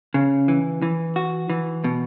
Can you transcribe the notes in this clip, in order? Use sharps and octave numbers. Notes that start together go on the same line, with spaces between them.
C#3
E3
E3
F#4
E3
B2